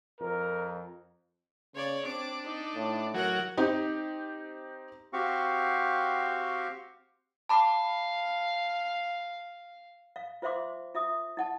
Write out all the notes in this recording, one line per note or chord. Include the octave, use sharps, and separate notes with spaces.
F2 A#4
C#3 C#5 D5
C4 D4 D6
D#4
A2
F#3 A#4 F#5
C4 D#4 G4
C4 F#4 G4 F5 C#6
F5 A5 B5 D6
F5
F4 C5 E5 F5 C6 D6
F4 E5 D#6
E4 F#5 A5